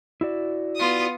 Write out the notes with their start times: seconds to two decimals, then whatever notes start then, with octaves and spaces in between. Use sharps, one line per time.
0.21 E4 F#4 D5
0.77 B3 F4 D#6